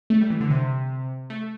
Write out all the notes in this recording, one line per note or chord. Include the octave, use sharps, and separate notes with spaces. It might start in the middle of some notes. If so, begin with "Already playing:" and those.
A3
G3
E3
D3
C3
A3